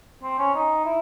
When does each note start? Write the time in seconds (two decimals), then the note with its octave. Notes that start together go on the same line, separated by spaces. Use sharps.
0.23 C4
0.38 C#4
0.54 D#4
0.85 E4